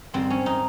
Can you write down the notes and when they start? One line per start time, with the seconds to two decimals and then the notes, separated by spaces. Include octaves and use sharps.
0.14 G#2 D#3 G3 C4
0.30 C#4
0.46 D#4